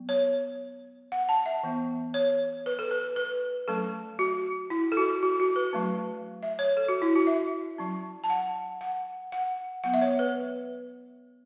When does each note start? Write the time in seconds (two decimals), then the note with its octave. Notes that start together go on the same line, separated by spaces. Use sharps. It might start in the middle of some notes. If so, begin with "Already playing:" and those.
Already playing: F#3 B3
0.09 C#5
1.12 F#5
1.29 A5
1.46 E5
1.63 E3 B3
2.14 C#5
2.66 B4
2.79 A4
2.91 B4
3.16 B4
3.68 F#3 A3 C#4 A4
4.19 F#4
4.70 E4
4.92 A4
4.97 F#4
5.23 F#4
5.40 F#4
5.56 B4
5.73 F#3 A3 C#4
6.43 E5
6.59 C#5
6.77 A4
6.88 F#4
7.02 E4
7.15 F#4
7.27 E5
7.78 F#3 C#4
8.24 A5
8.30 F#5
8.81 F#5
9.32 F#5
9.84 F#3 B3 F#5
9.94 E5
10.01 C#5
10.19 B4